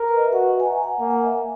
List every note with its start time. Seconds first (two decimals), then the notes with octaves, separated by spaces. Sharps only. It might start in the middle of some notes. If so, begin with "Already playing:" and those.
Already playing: A#4
0.08 B4
0.17 D#5
0.25 E5
0.32 F#4 F#5
0.60 G#5
0.66 A#5
0.83 F#5
0.99 A#3 G#5
1.10 F#5
1.22 E5
1.33 E5